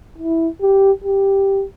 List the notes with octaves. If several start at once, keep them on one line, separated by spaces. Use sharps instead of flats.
E4
G4
G4